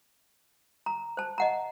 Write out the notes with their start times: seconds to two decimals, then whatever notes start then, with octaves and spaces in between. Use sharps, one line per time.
0.86 A#5
1.17 C5 A5
1.38 D#5 F#5 A#5